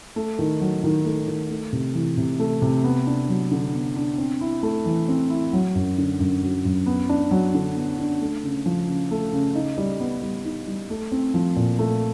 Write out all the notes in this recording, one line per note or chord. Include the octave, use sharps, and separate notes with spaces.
A3
D#3
F#3
D#3
A3
D#3
A3
C3
E3
C3
A3
C3
B3
D4
F#3
D3
B3
D4
C4
E4
A3
E3
C4
E4
F#3
F#2
D3
F#2
F#3
F#2
B3
D4
F#3
D3
B3
D4
A3
C#3
F3
C#3
A3
C#3
D#4
G3
B3
G3
D#4
G3
A3
C4
F3
A#2
A3